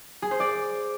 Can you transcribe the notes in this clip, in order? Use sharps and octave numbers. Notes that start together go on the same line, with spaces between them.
G#4
C5
D5